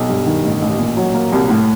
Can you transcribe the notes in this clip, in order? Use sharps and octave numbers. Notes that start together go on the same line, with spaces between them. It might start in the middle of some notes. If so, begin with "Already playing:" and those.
Already playing: B1
G2
D#3
A1
A1
A#2
F#3
A#3
C2
A2